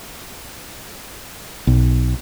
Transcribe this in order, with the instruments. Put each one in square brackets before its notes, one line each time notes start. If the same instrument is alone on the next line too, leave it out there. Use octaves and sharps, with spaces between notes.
[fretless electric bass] B1